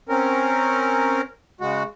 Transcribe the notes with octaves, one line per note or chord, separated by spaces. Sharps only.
C4 C#4 A#4
C#3 G#3 F#4